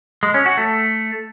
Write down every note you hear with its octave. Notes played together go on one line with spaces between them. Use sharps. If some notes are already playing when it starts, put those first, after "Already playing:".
G#3
C#4
F#4
A3